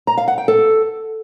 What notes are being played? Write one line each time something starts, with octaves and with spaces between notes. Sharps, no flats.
A#5
F5
F#5
G5
A4